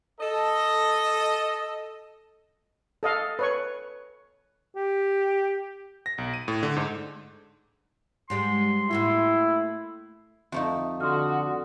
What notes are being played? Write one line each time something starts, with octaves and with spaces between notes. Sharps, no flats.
A4 D#5
A4 D#5 F5
B4 C#5 C#6
G4
A#6
B1
D#7
A2
D3
G#2
G#2 G3 G#3 C6
A2 A#3 E4 F#4
F2 A3 D#4 E5 F5
D3 F#4 C6 D#6 F6